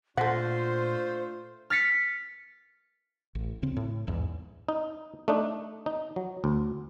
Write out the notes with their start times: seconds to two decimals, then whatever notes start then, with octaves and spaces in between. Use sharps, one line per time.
0.17 A#2 A3 D4 F4 A4 C5 F#5
1.70 F6 A6 B6 C#7
3.35 A1
3.62 D2 C#3 C4
3.76 A2
4.07 B1 E2 G#2
4.69 D#4
5.28 A3 D4 D#4
5.86 D#4
6.16 F#3
6.44 D2